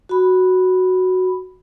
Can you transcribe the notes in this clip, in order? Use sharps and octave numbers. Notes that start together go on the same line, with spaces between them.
F#4 B5